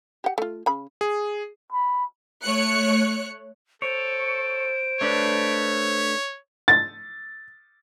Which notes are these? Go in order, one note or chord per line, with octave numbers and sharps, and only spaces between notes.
G4 F#5
A3 F4
C#3 B5
G#4
B5
A3 C#5 F#6 C#7
A4 C5 C#5 D7
A3 D4 B4 C#5
A6